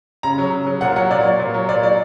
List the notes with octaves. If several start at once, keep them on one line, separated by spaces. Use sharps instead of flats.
C#3 A#5
F#3
C#3
F#3
A#2 F#5
F#3 F#5
A#2 D5
F#3
A#2
F#3
A#2 D5
F#3 D5